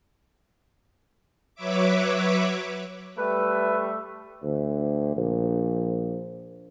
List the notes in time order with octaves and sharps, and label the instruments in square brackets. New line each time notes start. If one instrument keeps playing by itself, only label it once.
[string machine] F#3 B4 C#5 E5 D6
[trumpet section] G3 A3 E5 [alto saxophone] B4
[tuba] D2
A#1